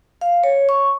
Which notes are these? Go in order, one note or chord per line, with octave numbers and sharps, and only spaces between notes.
F5
C#5
C#6